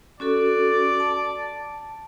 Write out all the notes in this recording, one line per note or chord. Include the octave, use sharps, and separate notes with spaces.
C#4 F#4 A4 D5
A5